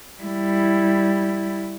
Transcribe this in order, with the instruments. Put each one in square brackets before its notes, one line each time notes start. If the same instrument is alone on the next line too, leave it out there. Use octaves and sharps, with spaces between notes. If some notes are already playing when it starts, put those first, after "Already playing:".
[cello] G3 E4